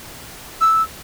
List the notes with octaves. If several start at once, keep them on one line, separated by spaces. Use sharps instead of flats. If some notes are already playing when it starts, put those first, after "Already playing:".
E6